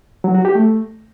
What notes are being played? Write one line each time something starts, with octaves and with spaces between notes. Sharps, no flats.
F#3
F#4
G4
A3